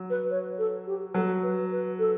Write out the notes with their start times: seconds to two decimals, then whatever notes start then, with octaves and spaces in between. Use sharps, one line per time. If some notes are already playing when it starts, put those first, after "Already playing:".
Already playing: F#3
0.10 B4
0.31 C#5
0.58 A4
0.87 G4
1.14 F#3 A4
1.43 B4
1.71 B4
1.99 A4